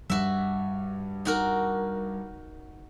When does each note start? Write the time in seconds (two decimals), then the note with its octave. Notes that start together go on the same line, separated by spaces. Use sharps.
0.10 G2 F#4 E5
1.25 D#4 F#4 A#4